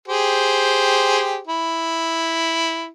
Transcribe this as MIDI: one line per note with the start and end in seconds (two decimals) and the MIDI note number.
0.08 1.40 67
0.08 1.40 68
0.08 1.40 72
1.47 2.87 64